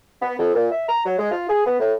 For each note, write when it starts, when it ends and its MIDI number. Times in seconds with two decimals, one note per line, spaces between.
0.22 0.34 59
0.39 0.52 41
0.55 0.67 46
0.71 0.84 76
0.88 1.04 82
1.05 1.14 54
1.19 1.29 56
1.31 1.49 65
1.49 1.63 68
1.66 1.80 59
1.80 1.94 45